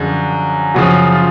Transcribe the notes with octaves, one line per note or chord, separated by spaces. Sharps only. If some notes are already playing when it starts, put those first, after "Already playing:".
Already playing: F#2 D3 F3 G#4
F#2 C#3 F3 F#4
F4